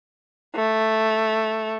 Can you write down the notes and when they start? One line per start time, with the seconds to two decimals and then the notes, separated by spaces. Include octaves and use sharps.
0.55 A3